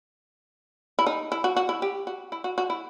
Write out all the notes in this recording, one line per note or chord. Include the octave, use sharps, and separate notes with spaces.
E4
D#4
E4
F#4
F#4
E4
G4
F#4
E4
F#4
F#4
E4